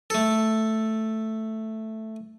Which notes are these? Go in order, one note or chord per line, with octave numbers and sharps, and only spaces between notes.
A3 A4